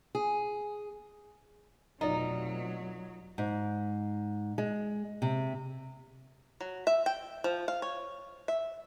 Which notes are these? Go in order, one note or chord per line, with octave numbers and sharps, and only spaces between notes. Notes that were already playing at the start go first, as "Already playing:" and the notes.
G#4
F1 B2 F#3 D#4 F4 D5 D#5
G#2
G#3
C3
F#3
E5
G5
F3
F5
C#5
E5